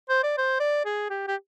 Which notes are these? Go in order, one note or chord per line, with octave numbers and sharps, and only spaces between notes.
C5
D5
C5
D5
G#4
G4
G4